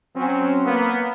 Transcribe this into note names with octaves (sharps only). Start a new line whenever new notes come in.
F#3 C4 C#4
A#3 B3